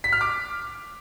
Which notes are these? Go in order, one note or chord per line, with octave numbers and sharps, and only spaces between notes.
B6
F6
D6